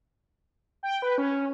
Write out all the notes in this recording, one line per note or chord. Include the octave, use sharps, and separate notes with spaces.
G5
B4
C#4